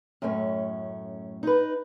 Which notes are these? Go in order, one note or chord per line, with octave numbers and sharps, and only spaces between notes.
F#2 A2 A3 C#4
D#4 B4